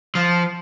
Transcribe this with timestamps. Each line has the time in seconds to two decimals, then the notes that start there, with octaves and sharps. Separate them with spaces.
0.15 F3